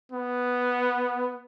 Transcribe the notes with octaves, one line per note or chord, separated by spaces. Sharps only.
B3